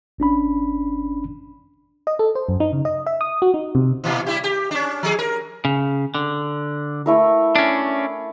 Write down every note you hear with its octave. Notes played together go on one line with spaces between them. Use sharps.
G1 C#4 D4 B5
D#5
A4
C5
F#2
D#4
C#3
D#5
E5
D#6
F#4
D#4
C3
A#2 E3
G3 E4 G4
G4
C#4 D4
F3 G#4
A#4
C#3
D3
A3 E4 A#4
C#4 D4